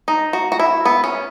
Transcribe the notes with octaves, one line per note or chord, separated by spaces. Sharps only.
D#4
F#4
F#4
E4
B3
C#4